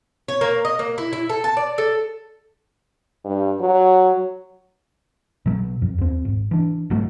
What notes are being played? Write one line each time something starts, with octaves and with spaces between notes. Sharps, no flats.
C#5
A#3
D#5
A#3
E4
E4
A4
A5
D5
A4
G2
F#3
B2 F#3
F2
D#2 C4
G#1
E3 D4
G#1 F#3 A3